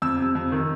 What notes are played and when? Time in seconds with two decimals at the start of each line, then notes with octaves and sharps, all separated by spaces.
0.02 F2 E6
0.19 C3
0.35 F2
0.52 D#3